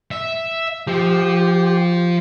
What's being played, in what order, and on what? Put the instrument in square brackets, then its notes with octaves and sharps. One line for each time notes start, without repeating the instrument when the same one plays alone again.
[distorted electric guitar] E5
[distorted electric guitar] F3 [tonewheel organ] G4